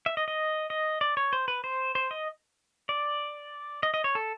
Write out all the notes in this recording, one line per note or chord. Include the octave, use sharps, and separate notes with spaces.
E5
D#5
D#5
D#5
D5
C#5
C5
B4
C5
C5
D#5
D5
D#5
D#5
C#5
A4